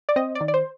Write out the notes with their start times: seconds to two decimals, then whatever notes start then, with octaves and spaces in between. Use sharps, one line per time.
0.09 D5
0.16 C4 D#5
0.35 D5
0.41 D#3
0.48 D5
0.54 C5